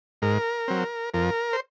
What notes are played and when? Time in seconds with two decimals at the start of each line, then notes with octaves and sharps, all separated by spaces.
0.22 G#2 A#4
0.68 F#3 C4
1.14 F2 A#4
1.53 C5